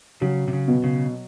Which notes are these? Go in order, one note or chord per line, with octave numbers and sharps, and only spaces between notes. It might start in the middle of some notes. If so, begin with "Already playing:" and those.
C#3 F#3
C3
C#3
B2
C#3